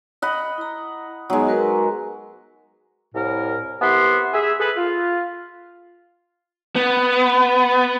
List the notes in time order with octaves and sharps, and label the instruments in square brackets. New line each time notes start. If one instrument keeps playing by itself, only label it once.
[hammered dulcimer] D#5 F#5 B5
[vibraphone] E4 A#5
[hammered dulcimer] F#3 G#3 [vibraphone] B3 D#4 D#5
[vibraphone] F#4 A#4 B4
[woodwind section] C2 A2 A#4
C2 B3 G4 E5 F#5 C6
G#4 E5
G#4 A4 B4
F4
[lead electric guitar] B3